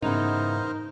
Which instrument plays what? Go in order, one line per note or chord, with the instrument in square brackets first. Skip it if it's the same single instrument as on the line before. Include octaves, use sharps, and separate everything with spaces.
[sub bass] G#2 [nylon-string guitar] C#3 E3 B3 [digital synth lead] D#4 [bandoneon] A#4 C5 D#5